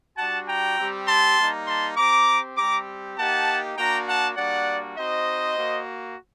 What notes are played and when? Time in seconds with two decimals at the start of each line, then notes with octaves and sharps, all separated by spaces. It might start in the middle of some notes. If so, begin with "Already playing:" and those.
0.17 G3 D4 F#4 F#5 A5
0.47 G5 A#5
0.78 G3 C4 G4
1.08 A5 C6
1.38 G3 A#3 D#4
1.67 A5 C6
1.97 C4 G4 A#5 D6
2.57 G3 C4 G4 A#5 D6
3.18 A#3 D#4 G4 F#5 A5
3.77 A#3 D4 F#4 G5 A#5
4.07 F#5 A5
4.37 G3 A#3 D4 F#4 D5 F#5
4.97 C4 D#4 F#4 C5 D#5
5.57 A#3 F#4